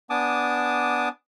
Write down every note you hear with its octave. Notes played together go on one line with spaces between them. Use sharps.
B3 D4 G#5 A5 D6 D#6